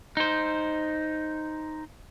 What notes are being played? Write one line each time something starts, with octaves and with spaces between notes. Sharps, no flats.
D#4 C5